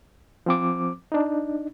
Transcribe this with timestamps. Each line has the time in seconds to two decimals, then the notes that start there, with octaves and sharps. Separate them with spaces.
0.46 F3 C4 D6
1.12 D4 D#4